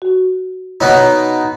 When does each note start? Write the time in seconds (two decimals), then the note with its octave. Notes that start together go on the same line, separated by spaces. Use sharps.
0.02 F#4
0.81 B2 B3 D#4 C#5